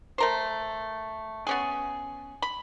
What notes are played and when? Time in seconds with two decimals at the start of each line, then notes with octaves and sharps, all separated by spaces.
0.18 A3 A#4 C5
1.47 B3 C#4 G#4
2.42 B5